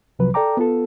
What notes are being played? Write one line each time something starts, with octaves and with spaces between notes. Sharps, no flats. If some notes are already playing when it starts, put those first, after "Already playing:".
C2 C3 F3 F#3 B4
A4 D5 G5 A#5 D6
B3 F4 A4